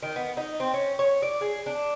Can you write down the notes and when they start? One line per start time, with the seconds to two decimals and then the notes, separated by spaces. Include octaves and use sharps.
0.02 D#3
0.16 B3
0.37 D#4
0.60 C4
0.74 C#4
0.99 C#5
1.22 D5
1.41 G#4
1.66 D4